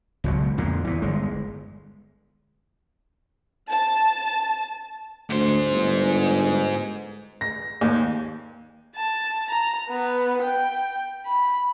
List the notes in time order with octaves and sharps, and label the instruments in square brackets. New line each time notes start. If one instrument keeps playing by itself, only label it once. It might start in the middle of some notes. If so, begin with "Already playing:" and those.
[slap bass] C#2 B2 F#3
F2 A#2 D3
E2 E3
G1 G#3
[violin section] A5
[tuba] D2 [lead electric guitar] G#2 C5
[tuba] G1
[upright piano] A#6
D#2
[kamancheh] A5
A#5
B3
G5
B5